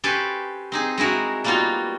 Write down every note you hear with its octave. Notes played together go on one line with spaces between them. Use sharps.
C#4 G4 A4 B4 C5 G#5
C4 D#4 G#4
G#3 D#4 E4 F#4 A#4
G3 A#3 B3 D#4 F4 F#4